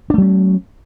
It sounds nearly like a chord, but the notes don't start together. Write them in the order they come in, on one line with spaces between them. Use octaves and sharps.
D4 A3 F#3 C#4